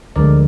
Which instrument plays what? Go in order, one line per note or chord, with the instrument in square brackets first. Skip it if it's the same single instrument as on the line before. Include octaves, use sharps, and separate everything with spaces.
[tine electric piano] D2 D3 F3 G#3 A#4 D5